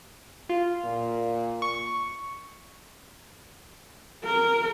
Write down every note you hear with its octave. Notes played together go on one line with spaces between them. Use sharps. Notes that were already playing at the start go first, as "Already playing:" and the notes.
F4
A#2
C#6
A#4